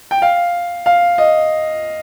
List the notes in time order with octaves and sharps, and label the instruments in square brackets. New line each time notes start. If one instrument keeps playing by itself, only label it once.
[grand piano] G5
F5
F5
D#5